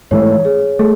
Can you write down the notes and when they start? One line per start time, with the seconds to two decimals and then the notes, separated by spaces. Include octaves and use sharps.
0.11 G#2 E3 A3 C#5
0.45 G#4
0.79 A3 G#4